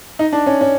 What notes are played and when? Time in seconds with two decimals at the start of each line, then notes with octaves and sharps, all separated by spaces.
0.19 D#4
0.32 D4
0.46 C#4
0.61 C#4